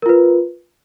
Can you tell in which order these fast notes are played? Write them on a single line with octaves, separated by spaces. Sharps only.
A#4 F4 B4